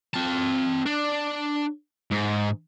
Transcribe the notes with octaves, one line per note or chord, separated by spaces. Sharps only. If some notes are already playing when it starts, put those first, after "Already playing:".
C4 A5
D4
G#2